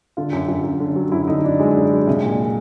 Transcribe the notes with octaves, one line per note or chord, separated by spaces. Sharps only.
D3 F4
F#2
F#2
F#2
D3
F#3
F#2 E4
D3 D#4
F#2 D4
F#3 G#3
F#2
F#3
C2
A#2